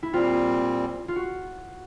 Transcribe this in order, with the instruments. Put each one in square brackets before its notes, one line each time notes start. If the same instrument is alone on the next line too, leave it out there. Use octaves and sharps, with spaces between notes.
[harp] E4
[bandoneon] A#2 G3 C4 [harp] F4
[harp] F4
F#4